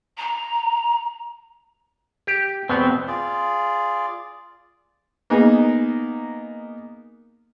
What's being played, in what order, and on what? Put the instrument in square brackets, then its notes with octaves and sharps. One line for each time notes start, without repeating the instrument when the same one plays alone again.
[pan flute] A#5
[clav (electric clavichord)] G4
[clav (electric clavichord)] E2 B2 B3 [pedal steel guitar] C4
[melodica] F4 G#4 D5
[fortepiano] A#3 B3 D#4 G#4